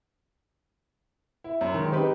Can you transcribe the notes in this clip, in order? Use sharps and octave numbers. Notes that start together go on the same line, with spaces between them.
E4
F#2
D#3 G#3
C4 D#4 G4 B4